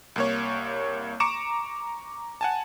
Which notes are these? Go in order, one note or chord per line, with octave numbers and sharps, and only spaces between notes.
C2 A#3 C#5
A#5 C#6 D6 C#7 D7 E7
F#5 G#5 A5